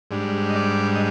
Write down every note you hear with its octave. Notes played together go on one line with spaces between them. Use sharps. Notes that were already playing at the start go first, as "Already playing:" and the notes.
G#2 G3 D4
D#5
D5
D#5